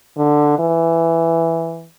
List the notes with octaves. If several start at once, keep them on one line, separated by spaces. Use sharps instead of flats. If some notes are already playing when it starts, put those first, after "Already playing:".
D3
E3